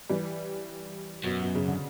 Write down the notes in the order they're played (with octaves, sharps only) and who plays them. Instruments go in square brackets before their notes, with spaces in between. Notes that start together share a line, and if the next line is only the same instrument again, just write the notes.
[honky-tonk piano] E3 G3
[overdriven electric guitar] F#2 [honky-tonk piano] B2
[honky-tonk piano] B2
C#3
D3